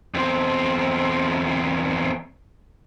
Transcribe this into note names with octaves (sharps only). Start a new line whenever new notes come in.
E2 C4